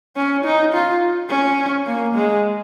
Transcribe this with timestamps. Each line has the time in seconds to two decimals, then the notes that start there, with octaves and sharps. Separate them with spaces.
0.16 C#4
0.45 D#4
0.73 F4
1.30 C#4
1.87 A#3
2.15 G#3